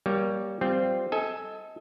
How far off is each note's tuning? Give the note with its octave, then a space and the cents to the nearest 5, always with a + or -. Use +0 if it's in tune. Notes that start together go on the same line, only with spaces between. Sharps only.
G3 +0 A#3 +25 C#5 +15
G3 +0 C4 -10 F4 +0
A4 -5 D#5 +30 G#5 +5